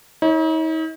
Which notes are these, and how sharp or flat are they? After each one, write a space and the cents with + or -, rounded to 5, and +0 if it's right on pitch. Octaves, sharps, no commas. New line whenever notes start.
D#4 +45 C#5 +0